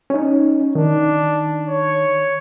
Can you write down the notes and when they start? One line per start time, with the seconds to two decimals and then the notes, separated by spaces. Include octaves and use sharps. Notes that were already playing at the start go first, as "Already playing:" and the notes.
0.10 C#4 D#4
0.75 D#3 D4
1.69 C#5